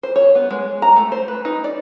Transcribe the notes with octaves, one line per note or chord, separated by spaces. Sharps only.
C5
C#5
B3
G#3
A#5
A3
C5
B4
D#4
D5